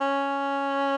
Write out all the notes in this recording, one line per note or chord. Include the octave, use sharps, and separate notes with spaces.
C#4